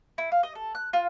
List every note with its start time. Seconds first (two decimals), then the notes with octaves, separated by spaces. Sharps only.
0.18 E4
0.32 F5
0.43 D#5
0.55 A4
0.75 F#6
0.93 F4